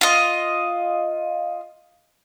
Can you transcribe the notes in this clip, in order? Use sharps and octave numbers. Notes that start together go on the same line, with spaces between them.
F4 D#5